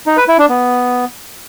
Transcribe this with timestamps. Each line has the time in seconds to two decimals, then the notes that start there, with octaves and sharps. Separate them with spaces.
0.07 D#4
0.17 B4
0.28 E4
0.39 D4
0.49 B3